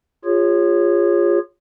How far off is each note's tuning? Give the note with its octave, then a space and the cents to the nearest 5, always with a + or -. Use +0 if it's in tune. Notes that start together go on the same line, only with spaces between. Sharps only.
F4 +0 G#4 -35 C#5 -5